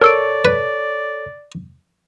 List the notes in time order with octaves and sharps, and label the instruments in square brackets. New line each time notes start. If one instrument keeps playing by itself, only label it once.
[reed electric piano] A4 C#5 C#6 [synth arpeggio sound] A#4 E6 D7 [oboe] D5
[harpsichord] B4